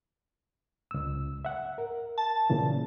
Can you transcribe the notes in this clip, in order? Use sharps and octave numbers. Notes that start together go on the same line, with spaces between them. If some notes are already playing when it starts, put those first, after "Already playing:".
C#2 E6
E5 F#5
A#4
A5
A#2 C#3 E3